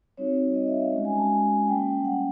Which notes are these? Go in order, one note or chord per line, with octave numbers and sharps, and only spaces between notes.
G3 C4 D#4 F#4 C#5
D#5
E5
F5
G#3 C#4 F#4
G#5
A5
G#5
G3 A#3 C#4 G5
F#5